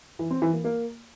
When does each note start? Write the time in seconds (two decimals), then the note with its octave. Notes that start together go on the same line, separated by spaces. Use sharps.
0.19 E3
0.31 C4
0.42 E3
0.53 A#3
0.64 A#3